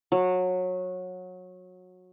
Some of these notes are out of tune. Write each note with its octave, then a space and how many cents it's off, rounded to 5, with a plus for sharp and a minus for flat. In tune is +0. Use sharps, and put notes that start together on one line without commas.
F#3 -20